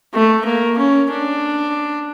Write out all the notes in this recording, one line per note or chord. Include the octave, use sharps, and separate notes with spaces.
A3
A#3
C#4
D4